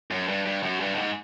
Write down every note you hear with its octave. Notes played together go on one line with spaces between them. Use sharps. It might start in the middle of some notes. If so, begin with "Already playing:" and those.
F#2
G2
G2
F#2
G2
A2
G#2